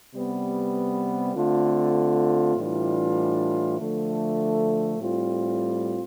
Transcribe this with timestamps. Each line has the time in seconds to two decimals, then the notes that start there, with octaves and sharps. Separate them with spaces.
0.14 C3 G3 B3
1.36 D3 A3 C4 F4
2.56 A2 E3 G3 D4 F4
3.78 D3 F3 A3
4.99 A2 G3 C4 F4